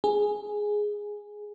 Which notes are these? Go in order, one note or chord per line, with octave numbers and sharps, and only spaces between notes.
G#4